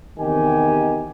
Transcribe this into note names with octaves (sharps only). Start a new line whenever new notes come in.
E2 C3 D#3 G4 G#5